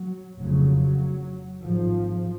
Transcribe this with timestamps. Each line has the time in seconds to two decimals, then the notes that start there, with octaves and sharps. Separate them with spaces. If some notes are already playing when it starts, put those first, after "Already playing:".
Already playing: F#3
0.38 F1 F2 C#3 F#3
1.63 G#1 G#2 F3